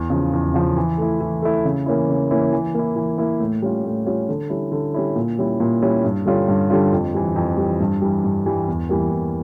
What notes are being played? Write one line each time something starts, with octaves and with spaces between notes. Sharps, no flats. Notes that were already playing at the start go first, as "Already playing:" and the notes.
Already playing: E2
C#3 F3
E2
C#3 F3
E3
A3 E4
E3
A3 E4
C#3
E3 A#3 C#4 E4
C#3
E3 A#3 C#4 E4
E3
A#3 E4
E3
A#3 E4
A2
G3 C#4 F4
A2
G3 C#4 F4
D3
G3 C#4 E4
D3
G3 C#4 E4
A#2
G3 C#4 E4
A#2
G3 C#4 E4
G2
D3 G3 C#4 F4
G2
D3 G3 C#4 F4
F2
E3 G3
F2
E3 G3
G2
E3 G3
G2
E3 G3
E2
E3 G3 A#3
E2